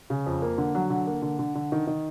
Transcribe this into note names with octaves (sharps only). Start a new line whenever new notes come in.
C#3
F2
A#3
D3
F#3
D3
A#3
D3
D3
D3
D#3
D#3